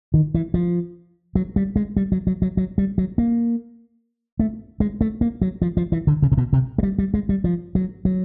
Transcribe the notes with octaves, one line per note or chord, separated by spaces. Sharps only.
D#3
E3
F3
F#3
G3
G#3
G3
F#3
F#3
F#3
F#3
G3
F#3
A#3
A3
G#3
A3
A#3
F#3
F3
F3
E3
D3
C#3
C3
B2
C3
G#3
G3
G3
G#3
G3
F3
F#3
F#3